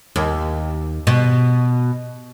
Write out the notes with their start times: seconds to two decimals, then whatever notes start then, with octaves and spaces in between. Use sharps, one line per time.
0.16 D#2
1.07 B2